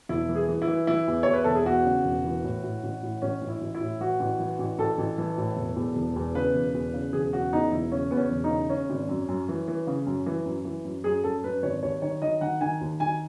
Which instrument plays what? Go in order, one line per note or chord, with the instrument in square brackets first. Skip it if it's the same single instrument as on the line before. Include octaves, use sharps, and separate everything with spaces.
[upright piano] E1 E4
E3
G#4
E3
E4
E3
E3 E4
E2
E2 C#5
B4
E1 A4
G#4
E2 F#4
C#3
E1
E3
A2
A2
A1
A2
A1 C#4
A1
E4
A1
E4
A2
E3 F#4
A1
E3
A1
A1 A4
A1
E3
A2
E1
E2
E1
E2
C#3 B4
E1
E2
C#3
E1 G#4
C#3 F#4
E2 D#4
E1 E4
C#3 C#4
E2 B3
C#4
E1
D#4
C#3
C#3 C#4
G#1
F#2
F#2
E3
E3
C#3
F#2
E3
F#2
E3
F#2
F#2 G#4
F#2 A4
F#2 B4
G#1 C#5
D#2 C#5
D#3 C#5
D#3 D#5
D#3 F#5
D#3 G#5
D#2
D#3 G#5